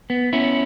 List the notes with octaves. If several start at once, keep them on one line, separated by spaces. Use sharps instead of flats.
B3
B3 C#4 E4